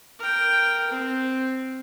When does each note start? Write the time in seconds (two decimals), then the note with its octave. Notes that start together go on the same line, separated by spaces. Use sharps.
0.19 A#4 G5
0.91 C4